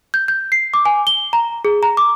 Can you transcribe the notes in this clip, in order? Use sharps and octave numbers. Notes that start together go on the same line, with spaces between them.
G6
G6
C7
D6
G#5
G7
A#5
G#4
A#5
D6